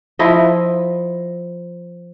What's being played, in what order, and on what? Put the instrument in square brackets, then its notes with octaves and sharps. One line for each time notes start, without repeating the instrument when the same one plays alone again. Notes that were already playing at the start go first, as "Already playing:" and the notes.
[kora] F3 E4 D#5